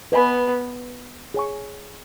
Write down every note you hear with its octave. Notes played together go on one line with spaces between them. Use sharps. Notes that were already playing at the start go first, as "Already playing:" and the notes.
B3 B4 D#5 G#5 B5
G#4 C#5 G#5 C#6